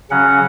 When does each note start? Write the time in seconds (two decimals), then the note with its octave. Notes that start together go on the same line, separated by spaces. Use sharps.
0.10 C#3 F#3 C#4 F#5